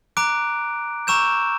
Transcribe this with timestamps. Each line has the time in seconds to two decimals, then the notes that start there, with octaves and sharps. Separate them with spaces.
0.17 A#5 D6 F#6 D7
1.07 A#5 C#6 E6 G6 E7